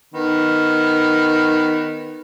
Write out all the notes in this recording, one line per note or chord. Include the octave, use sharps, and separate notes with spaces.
D#3 B3